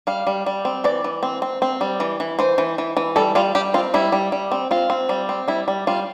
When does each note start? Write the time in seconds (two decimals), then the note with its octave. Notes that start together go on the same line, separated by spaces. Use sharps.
0.07 G3 F5
0.27 G3
0.46 G3
0.65 C4
0.84 E3 D5
1.04 E3
1.23 C4
1.42 C4
1.62 C4
1.81 G3
2.00 E3
2.20 E3
2.39 E3 C5
2.58 E3
2.78 E3
2.97 E3
3.16 G3 A4
3.35 G3 F4
3.55 G3 G4
3.74 C4 F4
3.94 G3 E4
4.12 G3
4.32 G3
4.52 C4
4.71 C4 F4
4.90 C4
5.09 G3
5.29 C4
5.48 G3 E4
5.68 G3
5.87 G3 F4